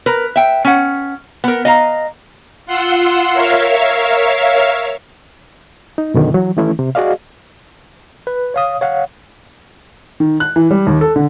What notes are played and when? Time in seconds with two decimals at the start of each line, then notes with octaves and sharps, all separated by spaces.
0.06 A#4 B4
0.36 E5 G5
0.65 C#4 F#5
1.44 B3 A#4
1.65 D#5 F5 A#5
2.66 F4 F#5 C6 E6
3.33 A#4 C#5 E5 F5
5.98 D#4
6.14 F#2 B2 D3 D#3
6.32 E3 F#3
6.57 D#3 E3 A3 C#4 E4
6.79 C3
6.95 F#4 G#4 D5 D#5 F5
8.27 B4
8.54 C#5 F5 D#6
8.81 C#5 F5 F#5
10.20 D#3
10.40 F#6
10.56 E3
10.71 G3
10.87 D#2
11.01 A4
11.16 D3